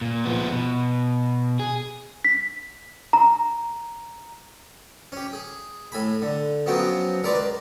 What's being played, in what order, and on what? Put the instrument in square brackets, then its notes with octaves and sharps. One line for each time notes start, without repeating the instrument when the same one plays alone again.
[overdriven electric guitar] A#2
F3 B3
B2
G#4
[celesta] B6
A#5
[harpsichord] C#4 G4
G#4
A2 G#5 B5
D3
C#3 F3 F#3 B3 F#4 G5
C#2 A#4 B4 D5 C6 D6